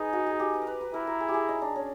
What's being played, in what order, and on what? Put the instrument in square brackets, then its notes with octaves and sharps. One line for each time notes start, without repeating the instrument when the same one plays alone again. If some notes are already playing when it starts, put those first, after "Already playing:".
Already playing: [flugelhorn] D#4 [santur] G#4 B4
[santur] F#4
G#4
G4
B4
A#4
B4
B4
[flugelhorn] E4 [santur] A#4
[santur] A#4
G#4
G4
G#4
D#4
D4
C#4